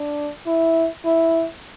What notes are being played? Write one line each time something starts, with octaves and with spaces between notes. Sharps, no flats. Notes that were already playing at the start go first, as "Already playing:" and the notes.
Already playing: D4
E4
E4